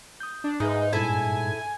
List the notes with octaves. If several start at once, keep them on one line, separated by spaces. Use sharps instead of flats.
D#6 G6
D4
G#2 G#3 D#4 B4 E5 D#6
G2 A#2 G3 E4 A4 G#5